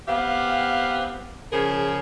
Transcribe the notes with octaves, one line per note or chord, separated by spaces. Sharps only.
B3 C4 G4 F5
C#3 F3 C#4 G#4 A#4